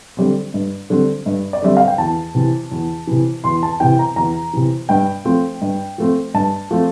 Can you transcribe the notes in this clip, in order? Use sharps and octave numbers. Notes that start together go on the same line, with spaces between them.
D3 G3 C4
G2
D3 G3 C4
G2
D5
D3 G3 C4 E5
F5
G5
E2 A5
C3 E3
E2
C3 E3
E2 C6
A5
C3 E3 G5
A#5
E2 A#5
C3 E3
G2 G5
F3 A3 C4
G2
F3 A3 C4
G2 A5
F3 A3 C4